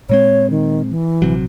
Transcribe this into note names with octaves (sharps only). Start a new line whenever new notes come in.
A#2 G#3 C4 C#5
D#3
E3
A#1 C3 F#3